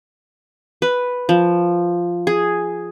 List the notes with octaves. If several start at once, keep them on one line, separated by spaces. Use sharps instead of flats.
B4
F3
G#4